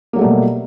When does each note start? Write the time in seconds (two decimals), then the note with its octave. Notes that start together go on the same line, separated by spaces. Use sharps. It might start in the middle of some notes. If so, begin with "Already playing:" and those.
0.13 A#3
0.16 F#3
0.19 A3
0.21 G3
0.24 B2